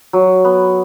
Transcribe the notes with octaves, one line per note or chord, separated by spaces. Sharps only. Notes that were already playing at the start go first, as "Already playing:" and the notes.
F#3
B3